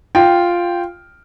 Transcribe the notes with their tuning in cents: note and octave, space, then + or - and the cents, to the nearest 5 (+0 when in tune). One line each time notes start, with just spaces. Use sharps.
F4 +0 G5 +0